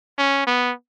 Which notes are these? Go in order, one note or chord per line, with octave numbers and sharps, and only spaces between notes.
C#4
B3